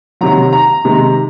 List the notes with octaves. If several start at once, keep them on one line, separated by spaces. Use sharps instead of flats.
C3 D#3 F#3 A#5
A#5
C3 D#3 G#3